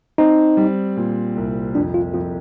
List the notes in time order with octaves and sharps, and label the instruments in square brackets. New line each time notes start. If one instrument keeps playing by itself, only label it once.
[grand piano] C4 [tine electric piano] D#4
[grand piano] G3
A#2
C2
[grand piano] F2 [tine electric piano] D4
[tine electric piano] F4
[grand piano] F2 [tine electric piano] F4